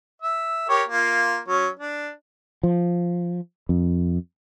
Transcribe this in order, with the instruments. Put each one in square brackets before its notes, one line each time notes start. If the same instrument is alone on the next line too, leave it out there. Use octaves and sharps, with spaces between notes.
[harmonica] E5
G4 A#4 C#5
A#3 F4
F#3 C#4
D4
[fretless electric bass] F3
F2